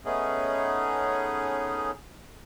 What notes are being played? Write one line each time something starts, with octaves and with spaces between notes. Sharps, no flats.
A3 B3 C#4 D#4 G#4